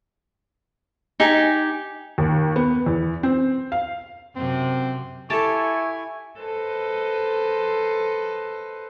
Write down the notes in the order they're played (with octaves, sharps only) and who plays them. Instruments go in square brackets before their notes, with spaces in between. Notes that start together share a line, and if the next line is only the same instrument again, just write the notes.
[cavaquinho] D#4 G4 G#5
[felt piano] D#2
B3
E2
C4
F5
[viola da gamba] F#2 C3 [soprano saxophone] C4
[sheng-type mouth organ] E4 G#5 [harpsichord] G4 A4 [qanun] A5 [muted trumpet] C#6
[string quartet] A4 B4 C5 D#5